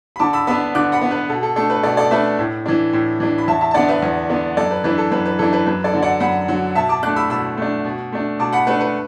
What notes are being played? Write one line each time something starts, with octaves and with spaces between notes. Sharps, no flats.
B5
D3 A5 D6
B5 E6
B3 D4 B5 E6
D3 D6 F#6
F#5 B5
B3 D4
B4
B2 A4
A4
A3 D4 A4
B4
B2 A4 D5
A4 D5
A3 D4 B4 E5
A2
E3 D4
A2
E3 D4
B5
E2 E5 A5
E5 A5
A5
D3 B3 D4 D5 F#5
B4 E5
E2
D3 B3 D4
F#2 A4 D5
B4
E3 D4 B4
A4
F#2 B4
B4
E3 D4 A4
B4
F#2 B4
A4 D5
D3 F#3
D5 F#5
F#2 F#5 B5
D3 F#3
B2 E5 A5
A5 D6
A3 D4 D6 F#6
B5 E6
B2 B5 E6
A3 D4
B2
A3 D4
B2 A5 D6
F#5 B5
A3 D4 B4
B4